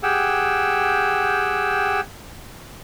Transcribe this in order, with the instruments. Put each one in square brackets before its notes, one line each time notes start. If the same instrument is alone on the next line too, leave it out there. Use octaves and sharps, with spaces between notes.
[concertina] G4 G#4 F#5 G5 E6